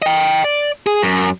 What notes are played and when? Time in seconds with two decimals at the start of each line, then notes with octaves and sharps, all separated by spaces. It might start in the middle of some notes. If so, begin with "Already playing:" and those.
0.02 D#5 G5
0.44 D5
0.87 G#4
1.03 F#2